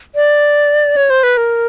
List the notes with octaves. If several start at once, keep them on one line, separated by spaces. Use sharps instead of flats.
D5
C#5
C5
B4
A#4